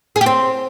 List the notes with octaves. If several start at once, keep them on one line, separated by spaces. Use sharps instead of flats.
G#4
G4
C4